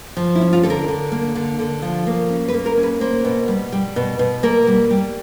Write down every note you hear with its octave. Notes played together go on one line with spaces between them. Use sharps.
F3
E4
C#4
F4
D3 A4
A#4
D3
A#3
D3
D3
F3
A#3
C#4
B4
A#3
A#4
C#4
B4
A#3 C5
B2
G3
G3
B2
B2
A#3 A#4
G3
G3